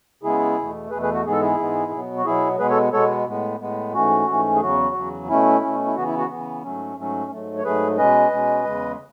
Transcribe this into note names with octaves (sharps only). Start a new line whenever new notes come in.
C#3 G#3 B3 E4 G#4
E2 B2 A3
E2 B2 A3 G#4 B4
G#4 B4
F#4
G#2 E3 G#3 B3 G#4
A4
E4 G#4
G#2 E3 G#3 B3
B2 F#3 B3
F#4
B2 F#3 B3 E4 G#4
B2 G#3 B3 G#4 B4
A4 C#5
B2 G#3 B3 A4 C#5
A2 G#3 B3
A2 G#3 B3
G#2 E3 A3 C#4 F#4
G#2 E3 A3 C#4
G#4
E2 C#3 F#3 F#4
E2 C#3 F#3
B2 A3 C#4 E4
B2 A3 C#4
E4
C#3 E3 B3 F#4
E4
F#4
C#3 E3 B3
G#2 F#3 A3 C#4
G#2 F#3 A3 C#4
G#2 F#3 A3
C#5
G#2 F#3 A3 G#4 B4
B2 G#3 C#4 B4 D#5
B2 G#3 C#4
E2 C#3 G#3